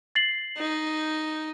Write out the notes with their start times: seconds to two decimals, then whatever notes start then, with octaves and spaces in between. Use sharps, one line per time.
0.15 A6 C7 F#7
0.57 D#4